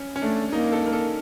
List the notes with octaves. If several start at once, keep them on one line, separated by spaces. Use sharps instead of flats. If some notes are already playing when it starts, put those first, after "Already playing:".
Already playing: C#4
C#4
A3 D4
A#3 D#4
A4
A#4
A4